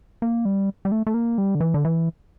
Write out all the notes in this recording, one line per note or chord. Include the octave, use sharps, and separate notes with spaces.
A#3
G3
G3
A3
A3
A#3
G3
D3
E3
D3
E3